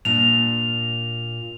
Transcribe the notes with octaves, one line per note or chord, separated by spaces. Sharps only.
A#2 D4 F7